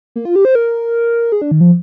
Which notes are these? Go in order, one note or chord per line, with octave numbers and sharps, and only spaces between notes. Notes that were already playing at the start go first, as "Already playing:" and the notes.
A#3
F4
G4
C5
A#4
G#4
D4
D#3
F3